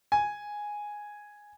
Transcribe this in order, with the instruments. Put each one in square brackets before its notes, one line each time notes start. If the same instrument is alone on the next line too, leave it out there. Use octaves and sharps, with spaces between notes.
[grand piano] G#5